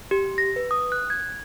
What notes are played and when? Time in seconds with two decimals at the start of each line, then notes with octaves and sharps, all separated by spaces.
0.11 G4
0.38 A#6
0.56 B4
0.71 D#6
0.92 F#6
1.10 G#6